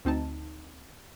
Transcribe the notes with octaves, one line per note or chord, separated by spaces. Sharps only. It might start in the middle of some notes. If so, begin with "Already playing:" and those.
D2 C4 D#4 A5